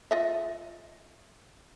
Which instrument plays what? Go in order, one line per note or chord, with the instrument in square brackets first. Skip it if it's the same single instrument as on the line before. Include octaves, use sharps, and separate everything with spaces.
[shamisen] F4 D#5 E5